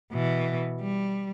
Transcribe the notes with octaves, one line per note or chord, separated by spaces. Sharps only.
B2 E3
G3